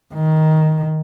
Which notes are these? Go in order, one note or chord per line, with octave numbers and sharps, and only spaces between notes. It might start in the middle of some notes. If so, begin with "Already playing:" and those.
D#3